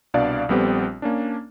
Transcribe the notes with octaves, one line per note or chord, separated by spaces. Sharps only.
C2 B2 D4 D5 F5
A#1 G3 B3 C4 G4 A4
A#3 C#4 D4